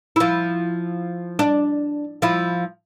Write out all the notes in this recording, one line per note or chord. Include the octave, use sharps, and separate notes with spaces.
F3 E4
D4
F3 E4